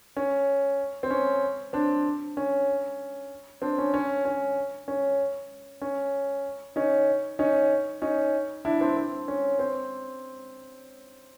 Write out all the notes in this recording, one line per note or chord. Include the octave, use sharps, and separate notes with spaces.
C#4
C4
C#4
C4 D4
C#4
C4 D4
C#4
C#4
C#4
C#4
C#4
C#4 D#4
C#4 D#4
C#4 D#4
D4 E4
C4 D4
C4
C#4
C4